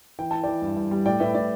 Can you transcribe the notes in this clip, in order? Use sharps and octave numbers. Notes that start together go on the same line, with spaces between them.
E3 G5
E4 A5
E3 D5 G5
G2
G2
G3
A2 D5 G5
A2 B4 E5
A2 D5